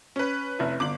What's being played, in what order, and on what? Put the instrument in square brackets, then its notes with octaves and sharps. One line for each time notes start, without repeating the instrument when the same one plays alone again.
[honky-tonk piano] C#4 B4
[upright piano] F1 E4
[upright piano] G1 F#7 [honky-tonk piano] D6